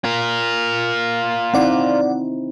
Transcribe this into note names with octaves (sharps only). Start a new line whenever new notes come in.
F4 A#4
C4 D#4 E4 D5 F#5